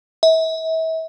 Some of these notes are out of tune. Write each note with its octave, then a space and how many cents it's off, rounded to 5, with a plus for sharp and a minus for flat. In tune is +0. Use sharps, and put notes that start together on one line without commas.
E5 -40